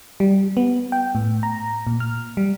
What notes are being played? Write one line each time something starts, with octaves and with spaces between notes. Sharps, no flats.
G3
B3
G5
A2
A#5
A#2
F6
G3